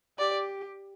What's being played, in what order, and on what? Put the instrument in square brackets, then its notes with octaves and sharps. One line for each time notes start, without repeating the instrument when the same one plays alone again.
[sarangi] G4 [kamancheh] D5